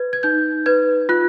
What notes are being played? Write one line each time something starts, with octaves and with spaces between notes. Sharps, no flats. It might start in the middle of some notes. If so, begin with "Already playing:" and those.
Already playing: B4 G#6
G#6
D#4 G6
B4 G#6
F4 F#6